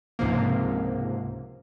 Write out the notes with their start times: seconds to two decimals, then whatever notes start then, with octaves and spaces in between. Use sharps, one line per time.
0.19 C#2 G#2 C3 F3 A#3